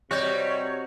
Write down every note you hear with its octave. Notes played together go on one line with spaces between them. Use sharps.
C3 G3 F#4 C#5 D#5 G6